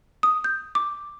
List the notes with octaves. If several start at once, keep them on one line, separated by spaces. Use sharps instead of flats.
D#6
G6
D6